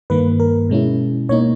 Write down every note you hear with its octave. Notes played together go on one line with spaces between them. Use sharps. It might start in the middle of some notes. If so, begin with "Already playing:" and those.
G2 D#3 A#3 B4
A#4
B2 G#3 C#4 E4
B2 A#3 D#4 C#5